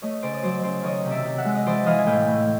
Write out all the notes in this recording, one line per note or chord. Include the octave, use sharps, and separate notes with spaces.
A3 C#5 D#5
C#3 C5 D5
D#5
F#3 C5 D5
C#3 C5 D5
D5
D#3 C#5 D#5
C3
D5 E5
C3
E5 F#5
G#3
D#5
E3 C5 D5
E3 D#5 F5
G#5
A2 F5 G5
A2